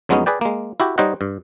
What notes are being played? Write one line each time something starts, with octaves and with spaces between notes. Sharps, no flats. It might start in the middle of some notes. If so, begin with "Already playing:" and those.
F2 F#3 G#3 B3 C#4 D#4
G#4 B4 D5 G5
G#3 A#3
E4 F#4 G4
G3 D#4 C5 C#5 D#5 F#5
G2